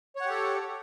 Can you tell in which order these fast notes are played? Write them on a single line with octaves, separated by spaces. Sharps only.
C#5 F#5 G4 A4